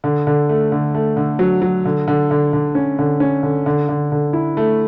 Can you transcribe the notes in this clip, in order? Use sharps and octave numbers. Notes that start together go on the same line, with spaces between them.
D3
D3
A3
D3
A3
D3
F#3
F#3
D3
D3
D3
D3
C#4
D3
C#4
D3
D3
D3
D3
E4
A3